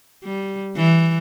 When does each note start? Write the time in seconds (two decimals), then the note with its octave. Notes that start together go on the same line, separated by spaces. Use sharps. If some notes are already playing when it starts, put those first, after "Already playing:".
0.24 G3
0.76 E3